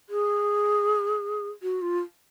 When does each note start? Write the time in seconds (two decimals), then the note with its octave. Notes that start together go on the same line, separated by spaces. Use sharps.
0.10 G#4
1.63 F#4
1.82 F4